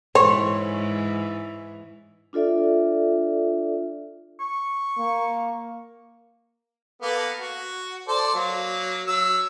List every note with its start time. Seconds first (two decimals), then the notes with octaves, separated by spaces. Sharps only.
0.15 G#2 E3 C5 C#5
2.33 D4 F4 A4 D5 E5
4.40 C#6
4.99 A#3
7.02 A#3 B3 A4
7.40 F#4
8.08 A4 C5 D5
8.35 F#3 A#3
9.07 F#3 E6